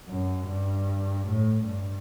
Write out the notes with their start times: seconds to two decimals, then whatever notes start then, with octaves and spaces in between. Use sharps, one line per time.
0.09 F#2
0.47 G2
1.27 A2
1.67 G2